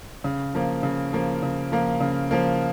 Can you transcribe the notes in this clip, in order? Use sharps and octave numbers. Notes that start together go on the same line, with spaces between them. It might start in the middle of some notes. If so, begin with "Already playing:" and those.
C#3
F3 A#3
C#3
F3 A#3
C#3
F3 A#3
C#3
F3 A#3